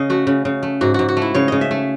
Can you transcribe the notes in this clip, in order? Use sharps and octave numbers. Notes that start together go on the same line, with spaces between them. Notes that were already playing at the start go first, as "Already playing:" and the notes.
Already playing: C#3 D#5
A3 F#4
C#3
C#3
A3
G#2 F#4
G#2 F#4
F#4
A3 E4
C#3 C#5
C#3 D#5
E5
A3